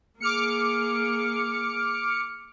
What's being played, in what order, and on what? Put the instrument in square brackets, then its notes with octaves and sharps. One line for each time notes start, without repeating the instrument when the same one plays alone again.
[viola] A#3 G#4 [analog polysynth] D6 F6 C#7